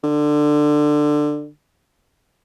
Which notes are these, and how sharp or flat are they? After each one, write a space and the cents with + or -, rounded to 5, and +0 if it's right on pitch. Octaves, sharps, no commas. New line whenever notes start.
D3 +15